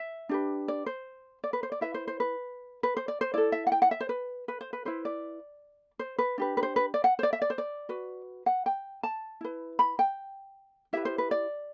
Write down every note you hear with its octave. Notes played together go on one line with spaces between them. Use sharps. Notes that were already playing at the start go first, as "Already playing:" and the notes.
Already playing: E5
D4 G4 B4
D5
C5
D5
B4
C5
D5
E4 B4 E5
C5
C5
B4
B4
C5
D5
C5
E4 A4 D5
E5
F#5
G5
F#5
E5
C5
B4
B4
C5
B4
E4 B4 C5
D5
C5
B4
D4 G4 B4
B4
C5
B4
D5
F#5
C5
D5
E5
D5
C5
D5
F#4 B4
F#5
G5
A5
E4 B4
B5
G5
E4 G4 B4 E5
C5
B4
D5